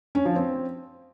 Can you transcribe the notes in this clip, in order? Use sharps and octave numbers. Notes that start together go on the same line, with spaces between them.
C#4
F3
C4